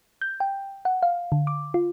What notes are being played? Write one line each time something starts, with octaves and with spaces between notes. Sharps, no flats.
G6
G5
F#5
F5
D3
D6
F4